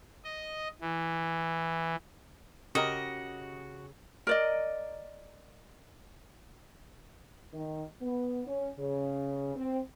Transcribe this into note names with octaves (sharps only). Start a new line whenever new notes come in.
D#5
E3
C#3 F#4 G4 A#4 D#5
A#4 D5 D#5
D#3
B3
C#4
C#3
C4